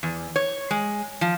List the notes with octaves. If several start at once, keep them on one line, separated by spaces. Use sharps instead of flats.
E2
C#5
G#3
F3